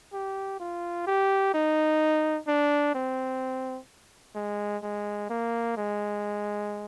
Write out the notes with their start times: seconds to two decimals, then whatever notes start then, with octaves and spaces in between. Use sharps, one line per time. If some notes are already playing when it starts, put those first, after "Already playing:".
0.13 G4
0.60 F4
1.07 G4
1.54 D#4
2.47 D4
2.95 C4
4.35 G#3
4.83 G#3
5.30 A#3
5.77 G#3